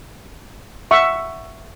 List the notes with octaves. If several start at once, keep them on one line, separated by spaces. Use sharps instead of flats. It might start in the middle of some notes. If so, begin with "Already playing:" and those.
E5 F#5 C#6